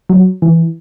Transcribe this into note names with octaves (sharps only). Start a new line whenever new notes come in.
F#3
E3